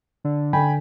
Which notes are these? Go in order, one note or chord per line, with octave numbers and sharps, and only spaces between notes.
D3
D3 G5 G#5 B5